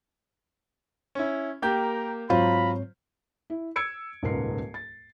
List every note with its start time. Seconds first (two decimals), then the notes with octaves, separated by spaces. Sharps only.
1.15 C#4 E4
1.62 A#3 G4 A#4 G5 A#5 G6
2.30 G#2 F#3 C4 F4 C5 C#5 A#5 B5
3.50 E4
3.76 E6 G#6 C#7 D7
4.23 D#1 C#2 G#2 A#4 B4 C7
4.74 A6